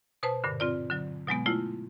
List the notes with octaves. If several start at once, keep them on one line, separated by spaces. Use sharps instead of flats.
B2 B4 C5 A5
G2 A#2 D3
C4 F4 D5
D3 F#3
B2 F#3 G#3 B3
A3 E4 F4